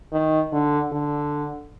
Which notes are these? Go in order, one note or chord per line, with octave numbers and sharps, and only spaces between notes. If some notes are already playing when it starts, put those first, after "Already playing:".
D#3
D3
D3